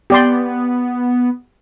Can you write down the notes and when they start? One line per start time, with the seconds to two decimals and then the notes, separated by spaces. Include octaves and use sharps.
0.10 B3 G4 D5 C6